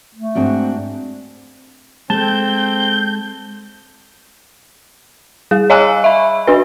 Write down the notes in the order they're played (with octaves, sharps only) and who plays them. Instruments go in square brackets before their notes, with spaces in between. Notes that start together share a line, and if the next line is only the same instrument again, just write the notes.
[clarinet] A3
[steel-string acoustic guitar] G#2 D4 F#4 [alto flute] C4
[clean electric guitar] G#3 G#4 A4 [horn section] C4 [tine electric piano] A5 [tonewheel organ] G6
[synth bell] G3 G#4
C#5 D#5 F5 G#5 E6 F#6
E5 B5
D4 F#4 B4